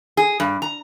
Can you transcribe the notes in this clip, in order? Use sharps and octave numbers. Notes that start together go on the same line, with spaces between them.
G#4
G2
A#5